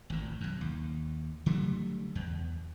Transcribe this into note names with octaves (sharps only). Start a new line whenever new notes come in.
G#1 A2
B1 F#2
D#2
D3 F#3 G3 A3
E2